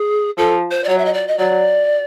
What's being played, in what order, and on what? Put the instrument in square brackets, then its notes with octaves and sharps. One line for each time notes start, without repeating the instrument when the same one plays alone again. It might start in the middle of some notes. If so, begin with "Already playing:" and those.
Already playing: [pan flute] G#4
[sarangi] F3 [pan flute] A4
[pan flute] C5
D5
[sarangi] F#3 [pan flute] C#5
[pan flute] E5
D#5
D5
D#5
[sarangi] F#3 [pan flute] D5